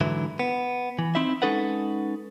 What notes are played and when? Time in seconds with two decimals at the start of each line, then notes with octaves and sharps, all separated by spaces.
0.01 G#2 D3 E3 F#3 E4
0.39 B3
0.99 E3
1.15 C4 D#4 E4 E5
1.42 G#3 C#4 D#4 A4 B4 F#5